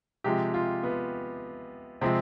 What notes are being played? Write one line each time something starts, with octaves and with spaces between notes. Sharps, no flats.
C3 F3 G#3 G4
F4
B3
C3 F3 G#3 C4